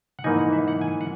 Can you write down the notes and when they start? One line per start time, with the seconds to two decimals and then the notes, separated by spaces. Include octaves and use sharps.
0.19 F#5
0.24 G#2 E3 A#3 D#4 G#5
0.39 F#5
0.53 E5
0.68 F#5
0.81 G#5
1.01 F#5